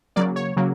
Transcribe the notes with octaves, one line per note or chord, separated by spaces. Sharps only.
C#3 F#3 A#3 D5
C#5
C#3 F#3 A#3